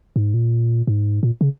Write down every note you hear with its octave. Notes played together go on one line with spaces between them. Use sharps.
G#2
A#2
G#2
A#2
C#3